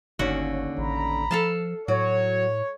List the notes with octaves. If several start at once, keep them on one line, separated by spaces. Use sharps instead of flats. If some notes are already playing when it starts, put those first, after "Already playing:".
G1 D#2 D3 C#4 F#4
A1 A#5 B5
F3 A4 F5 A5
A2 F#3 C#5